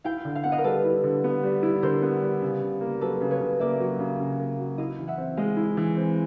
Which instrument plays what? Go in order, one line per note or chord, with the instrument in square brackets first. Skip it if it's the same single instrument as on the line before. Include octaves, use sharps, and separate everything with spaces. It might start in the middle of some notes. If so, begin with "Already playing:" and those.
[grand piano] E4 [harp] F5 G5
[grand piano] D3
[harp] F5
[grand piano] B3 [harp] F#5
[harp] D#5 F5
A#4
[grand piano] G3 [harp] A4 B4
[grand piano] E4
D3
B3
G3
E4
[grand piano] D3 [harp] A#4 C5
[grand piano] B3
G3
C#3
C#3
A#3
[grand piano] F#3 [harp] A4 B4
[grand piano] C#3
[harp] B4 C#5
[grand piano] C#3
[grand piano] A#3 [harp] D5 E5
[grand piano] F#3
C#3
C#3
A#3
F#3
[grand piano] E4 [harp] D#5 F5
[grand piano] E3
[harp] E5 F#5
[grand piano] C4
[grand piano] G#3 [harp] D#5 F5
[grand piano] E4
E3
C4